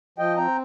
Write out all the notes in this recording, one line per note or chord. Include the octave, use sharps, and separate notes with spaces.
F3 D#5 G5
C4 G5 A#5